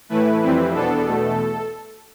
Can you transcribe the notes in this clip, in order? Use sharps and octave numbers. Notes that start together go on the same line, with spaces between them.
A2 E3 A3 E4 B4
F2 E3 G3 C4 E4
E2 B2 B3 D4 A4
E2 B2 A3